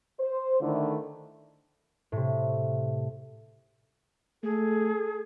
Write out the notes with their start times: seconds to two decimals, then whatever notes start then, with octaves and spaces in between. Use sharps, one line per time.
0.19 C5
0.60 D3 D#3 A3 E4
2.12 A2 C3
4.43 A3 G#4 A4